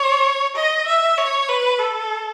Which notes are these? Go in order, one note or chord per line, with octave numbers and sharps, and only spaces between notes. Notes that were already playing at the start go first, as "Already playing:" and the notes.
Already playing: C#5
D#5
E5
C#5
B4
A4